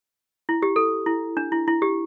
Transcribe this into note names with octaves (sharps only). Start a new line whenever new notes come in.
E4
G4
A4
E4
D4
E4
E4
G4